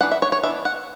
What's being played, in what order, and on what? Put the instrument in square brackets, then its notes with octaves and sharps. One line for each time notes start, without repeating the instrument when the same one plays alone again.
[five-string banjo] E3 B3 D4 F#5
E5
C#5
C#5
E3 B3 D4 E5
F#5